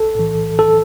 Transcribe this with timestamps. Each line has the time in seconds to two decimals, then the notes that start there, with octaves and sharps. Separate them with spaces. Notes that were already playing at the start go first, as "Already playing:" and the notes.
Already playing: B1 A4
0.15 A2 E3
0.59 A4